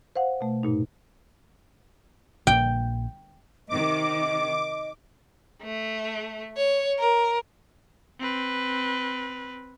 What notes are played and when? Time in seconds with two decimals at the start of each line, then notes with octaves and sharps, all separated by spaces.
0.16 C5 F5 F#5
0.41 B2 A3
0.63 G2 A#2 D#4
2.47 A#1 A#2 G5
3.69 C3 D#3 D#5 D6
5.63 A3
6.57 C#5
6.99 A#4
8.20 C4 B4